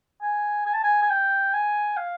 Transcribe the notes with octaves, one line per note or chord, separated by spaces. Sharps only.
G#5
G#5
A5
G#5
G#5
G5
G#5
F5